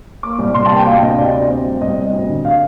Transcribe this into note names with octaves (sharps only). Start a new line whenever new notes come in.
A#3 D6
C2
C3 C6
A5
A#3
G5
D2 F5
C3 D#5
D2 D5
D2
C4
G3
C2 D#5
C4
D2
D3
F5